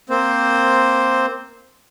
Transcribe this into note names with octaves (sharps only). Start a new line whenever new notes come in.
A#3 C4 C5